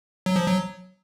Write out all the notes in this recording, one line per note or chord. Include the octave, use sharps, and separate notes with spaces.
F#3
F3
F#3